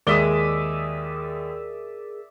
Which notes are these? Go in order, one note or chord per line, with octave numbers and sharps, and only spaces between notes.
D#2 G#3 G#4 A#4 D5 E5 D#6 G7